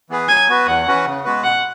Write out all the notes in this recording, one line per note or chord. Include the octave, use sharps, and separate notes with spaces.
E3 B3 G#4 B4
F#3 G#5
B3 F#4 B4
E2 F#5
E3 C#4 F#4 B4
C#3
G#3 B3 F#4 B4
B2 F#5